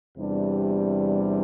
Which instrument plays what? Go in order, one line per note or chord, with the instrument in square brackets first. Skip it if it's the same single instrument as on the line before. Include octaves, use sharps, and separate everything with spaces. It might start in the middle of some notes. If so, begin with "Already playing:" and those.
[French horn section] E2 C3 G3 D4